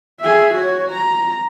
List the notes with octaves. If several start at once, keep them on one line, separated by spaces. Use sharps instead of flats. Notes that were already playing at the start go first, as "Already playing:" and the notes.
G#4 E5
F#4 C#5
A#5